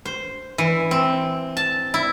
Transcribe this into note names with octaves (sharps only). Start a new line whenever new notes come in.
C5
E3
C4
A5
E4